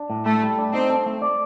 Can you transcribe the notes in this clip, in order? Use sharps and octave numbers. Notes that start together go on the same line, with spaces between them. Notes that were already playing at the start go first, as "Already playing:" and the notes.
Already playing: D4
A2
A3 A4
G3
D4
C4 D#4
A4
A3
D5